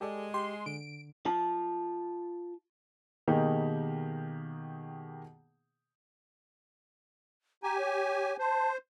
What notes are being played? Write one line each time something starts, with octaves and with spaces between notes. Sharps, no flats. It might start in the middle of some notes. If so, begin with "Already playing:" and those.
G#3 G4 A4 D5
G4 C6
D3 D7
F4 A5
B2 D#3 A#3 D#4 G4 G#4
G4 G#5 A#5
C#5
C5 A5